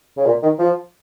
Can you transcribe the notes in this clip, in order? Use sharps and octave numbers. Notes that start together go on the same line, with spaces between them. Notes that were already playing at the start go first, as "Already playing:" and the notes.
C#3
A#2
D#3
F3